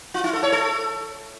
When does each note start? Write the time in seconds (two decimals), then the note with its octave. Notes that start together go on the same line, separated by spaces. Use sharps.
0.14 F4
0.24 E4
0.33 A4
0.43 C#5
0.52 A4